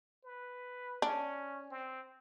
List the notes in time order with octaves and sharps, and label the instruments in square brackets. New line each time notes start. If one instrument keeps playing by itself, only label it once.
[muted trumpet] B4
[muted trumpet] C#4 [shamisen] D4
[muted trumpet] C4